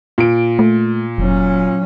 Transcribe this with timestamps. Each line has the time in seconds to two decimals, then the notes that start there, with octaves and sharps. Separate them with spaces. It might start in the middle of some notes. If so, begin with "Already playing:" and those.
0.18 A#2 D7
0.59 A3
1.18 F1 F#3 C#4